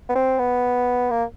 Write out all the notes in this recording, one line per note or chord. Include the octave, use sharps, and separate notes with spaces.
B3
C4
B3
A#3